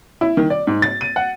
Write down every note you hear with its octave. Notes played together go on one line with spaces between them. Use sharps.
E4
D#3
D5
G#2
A6
D#7
F#5